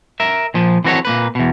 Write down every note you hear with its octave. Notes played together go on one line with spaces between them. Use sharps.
A#4 E5
A#2 F3
E3 C4 F#4 A4 C#5
A#2 A#3 B4
E2 B2